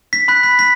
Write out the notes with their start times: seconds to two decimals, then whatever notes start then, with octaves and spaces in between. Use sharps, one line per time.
0.13 B6
0.28 B5 F#6 B6
0.43 B6
0.59 B6